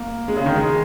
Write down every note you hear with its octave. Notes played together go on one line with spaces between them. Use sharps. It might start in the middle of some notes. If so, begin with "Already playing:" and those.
Already playing: A#3
G#3
C#3
D#3
G#3